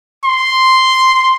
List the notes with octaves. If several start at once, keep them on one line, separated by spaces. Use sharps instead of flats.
C6